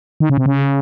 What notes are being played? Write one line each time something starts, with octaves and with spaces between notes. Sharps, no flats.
D#3
C#3
C3
C#3